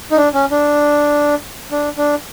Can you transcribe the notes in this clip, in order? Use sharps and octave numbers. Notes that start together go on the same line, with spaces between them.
D#4
D4
C#4
D4
D4
D4